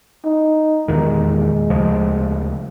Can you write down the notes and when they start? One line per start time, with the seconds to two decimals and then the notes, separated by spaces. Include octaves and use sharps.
0.25 D#4
0.88 E2 A#2 D#3 G#3
1.70 D2 C#3 F3